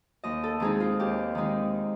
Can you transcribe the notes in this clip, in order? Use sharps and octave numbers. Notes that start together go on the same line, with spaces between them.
D#2 D#5
A4
D#3 G#3 C4 D#4 G#4
F4
D#2 G4
D#3 G#3 C4 D#4